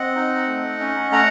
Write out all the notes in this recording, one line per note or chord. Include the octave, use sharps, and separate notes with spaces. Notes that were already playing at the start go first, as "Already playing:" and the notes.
Already playing: C4 D#5 F#5
D#4
A3
C#4
A3 F#5 A#5